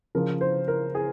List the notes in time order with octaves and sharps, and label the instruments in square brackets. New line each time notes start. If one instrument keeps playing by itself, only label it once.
[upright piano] C#3 F3 A#4
C5
A#4
G#4